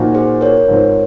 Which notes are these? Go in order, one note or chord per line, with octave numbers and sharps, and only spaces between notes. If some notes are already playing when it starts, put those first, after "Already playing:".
Already playing: A#2 F3 A#3 D#4 F#4
G#4 C5
A#4 C#5
G#2 F3 C4